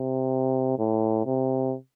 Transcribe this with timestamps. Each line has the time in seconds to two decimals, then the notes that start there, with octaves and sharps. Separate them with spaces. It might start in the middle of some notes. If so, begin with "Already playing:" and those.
Already playing: C3
0.79 A2
1.26 C3